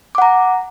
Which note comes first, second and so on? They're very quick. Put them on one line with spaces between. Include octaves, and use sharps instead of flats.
D6 F#5 A#5